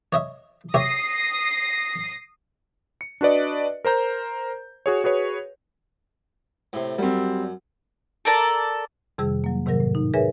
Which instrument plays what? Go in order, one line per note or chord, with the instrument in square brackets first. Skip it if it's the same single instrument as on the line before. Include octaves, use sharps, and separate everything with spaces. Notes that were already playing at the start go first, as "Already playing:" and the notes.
[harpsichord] C#5 D#5 E5
[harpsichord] G4 C#5 E5 [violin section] D#6 A#6 C7
[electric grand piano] C#7
D4 F#4 B4 D5 D#5
A#4 C5 A#5 G6
F#4 G#4 C#5
F#4 G#4 B4 C#5
[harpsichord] A2 C3
[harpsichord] F#2 [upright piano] G3 C4
[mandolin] A4 A#4 D5 A5
[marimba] F2 C3 D#3 G3 G#4 E6
F#3 A#3
G#2 C3 D#3 F#3 A#4 A#6
A2
D#4
G#4 A#4 B4 C#5 E5 G#5